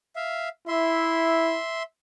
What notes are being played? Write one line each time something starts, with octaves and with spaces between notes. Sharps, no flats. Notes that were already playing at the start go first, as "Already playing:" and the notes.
E5 F5
E4 E5 C6